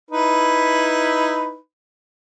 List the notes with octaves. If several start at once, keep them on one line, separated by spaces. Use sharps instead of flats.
D#4 E4 B4